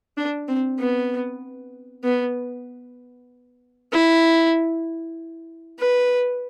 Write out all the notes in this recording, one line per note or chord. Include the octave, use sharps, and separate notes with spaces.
D4
C4
B3
B3
E4
B4